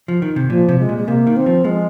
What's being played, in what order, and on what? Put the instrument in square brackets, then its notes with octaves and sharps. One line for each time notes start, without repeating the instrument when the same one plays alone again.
[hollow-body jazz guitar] F3
D#3
C3
[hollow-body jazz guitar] A#2 [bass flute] F3
[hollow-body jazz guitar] C3
[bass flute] G#3
[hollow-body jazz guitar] A#2
[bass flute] G#3
[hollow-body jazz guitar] C3 [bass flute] A#3
[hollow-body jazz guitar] D#3
[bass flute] C4
[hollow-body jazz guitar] F3
[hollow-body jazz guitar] F3 [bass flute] G#3